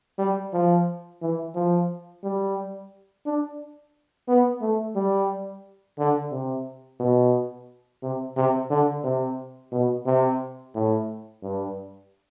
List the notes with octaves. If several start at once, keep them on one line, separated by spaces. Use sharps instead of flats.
G3
F3
E3
F3
G3
D4
B3
A3
G3
D3
C3
B2
C3
C3
D3
C3
B2
C3
A2
G2